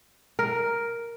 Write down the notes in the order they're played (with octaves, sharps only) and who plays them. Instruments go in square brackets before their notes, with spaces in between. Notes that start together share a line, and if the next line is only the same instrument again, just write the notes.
[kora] A#4